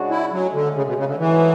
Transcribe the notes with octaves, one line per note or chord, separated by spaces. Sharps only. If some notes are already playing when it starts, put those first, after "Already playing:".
Already playing: C#3 G#3 D4 F#4
E4
A2 F#3 G#3 C#4
D3
C#3
B2
C#3
D3
G#2 E3 F#3 A3 E4 G#4